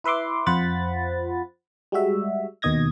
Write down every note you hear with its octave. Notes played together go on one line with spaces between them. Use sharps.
E4 B4 E5 C6 D6
F2 F4 C5 F#5 B5 A6
G3 G#3 F#4 E5
D#2 B2 D#3 D#5 G#6 A#6